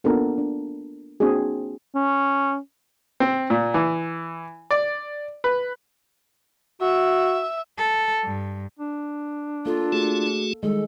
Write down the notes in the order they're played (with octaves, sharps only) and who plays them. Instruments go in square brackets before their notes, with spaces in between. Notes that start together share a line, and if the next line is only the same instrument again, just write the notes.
[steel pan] A#3 B3 D4 F4 A4 A#4
D4
A#3 C4 D4 F#4 G#4
[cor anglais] C#4
[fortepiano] C4
A#2
E3
D5
B4
[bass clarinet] F#4 [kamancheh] E5
[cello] A4
G2
[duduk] D4
[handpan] A#3 A4 [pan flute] F4
[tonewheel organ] A3 F#4 G#4
[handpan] D#3 G3 G#3 [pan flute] A4